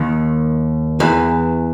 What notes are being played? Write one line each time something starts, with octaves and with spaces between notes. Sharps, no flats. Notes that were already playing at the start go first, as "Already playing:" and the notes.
Already playing: D#2 D#3
E2 E3